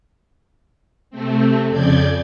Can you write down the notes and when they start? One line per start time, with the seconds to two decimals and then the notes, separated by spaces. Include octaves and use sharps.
1.11 C3 A3 C4
1.69 F2 C#3 D5 G6 G#6